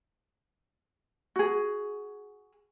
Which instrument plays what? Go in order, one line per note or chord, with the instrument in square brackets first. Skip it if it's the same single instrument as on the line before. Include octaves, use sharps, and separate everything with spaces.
[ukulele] F#4 G#4